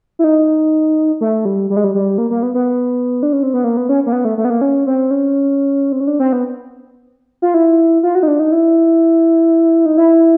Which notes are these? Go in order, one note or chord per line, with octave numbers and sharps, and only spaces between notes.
E4
D#4
A3
G3
G3
G#3
G3
G3
A#3
A#3
B3
B3
D4
C#4
C4
B3
A#3
B3
C#4
A#3
B3
A3
A3
B3
A#3
C#4
C4
C#4
C4
C#4
D4
C4
B3
F4
E4
F4
F#4
D#4
D4
D#4
E4
D#4
E4